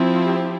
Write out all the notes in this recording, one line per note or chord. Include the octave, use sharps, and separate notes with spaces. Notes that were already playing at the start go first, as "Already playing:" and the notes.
Already playing: F3 C4 E4
G4